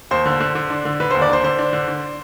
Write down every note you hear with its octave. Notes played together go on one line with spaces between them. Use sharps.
D#2 C5
D3
D3
D3
D4
D3
D3 B4
D#2 C5
D5
D4 C5
D3 C5
D4
D3
D4